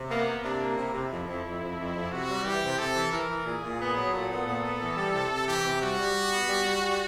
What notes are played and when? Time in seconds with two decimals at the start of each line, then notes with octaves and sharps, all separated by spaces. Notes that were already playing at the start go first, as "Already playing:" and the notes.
Already playing: C3
0.10 A#3 B3
0.28 A#3
0.44 C3 D4
0.61 A#3
0.77 C3 E4
0.94 C3
1.11 F2
1.27 F2
1.44 F2
1.61 F2
1.78 F2
1.95 F2
2.12 C3 F#4
2.28 G3
2.45 E3 G4
2.62 C3
2.79 C3 A4
2.95 E3
3.12 E3 A#4
3.29 E3
3.46 A#2 G#4
3.62 A#2
3.79 B3
3.96 F#3
4.13 A#2 A4
4.30 B3
4.46 A#2
4.64 B3
4.81 E3
4.97 G3
5.13 C3
5.31 C3
5.47 E3 G4
5.65 C3
5.81 G3 F#4
5.99 G3
6.15 G3
6.32 B3
6.49 G3
6.66 G3
6.82 G3